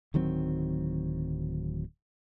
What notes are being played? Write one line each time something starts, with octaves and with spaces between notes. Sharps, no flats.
D1 D#3 F#3 C4